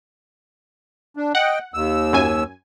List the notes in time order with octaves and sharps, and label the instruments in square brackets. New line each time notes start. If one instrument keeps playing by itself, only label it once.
[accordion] D4
[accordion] D#5 G5 [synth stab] F#5
[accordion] D#2 E6
[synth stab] F#2 G#5